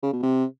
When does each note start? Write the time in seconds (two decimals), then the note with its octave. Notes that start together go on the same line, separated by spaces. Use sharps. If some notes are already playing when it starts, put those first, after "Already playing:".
0.03 C#3
0.13 B2
0.23 C3